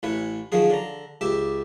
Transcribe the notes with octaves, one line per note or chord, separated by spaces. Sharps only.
A1 E3 B4 C#5
D#3 F3 F#3 G#4
D3 A#5
C#2 G4 E5